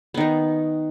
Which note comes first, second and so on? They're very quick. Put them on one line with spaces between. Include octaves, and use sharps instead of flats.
B3 D#3 D#4